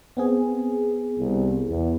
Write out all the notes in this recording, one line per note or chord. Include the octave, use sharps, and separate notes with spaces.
B3 C4 G#4
C2
E2